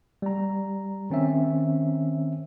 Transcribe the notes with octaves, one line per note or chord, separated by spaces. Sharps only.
G3 A#5
D#3 C4 C#4 E5